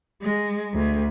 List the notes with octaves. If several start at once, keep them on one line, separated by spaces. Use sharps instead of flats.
G#3
D2